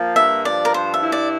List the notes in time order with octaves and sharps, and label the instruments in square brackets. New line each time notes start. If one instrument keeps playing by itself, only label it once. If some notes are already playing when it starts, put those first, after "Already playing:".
Already playing: [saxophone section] F3 A#3
[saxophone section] G2 [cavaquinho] E5
[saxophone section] F3 [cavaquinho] D5
[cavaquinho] A#4
[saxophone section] G2 [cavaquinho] C5
[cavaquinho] E5
[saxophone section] E4
[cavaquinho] D5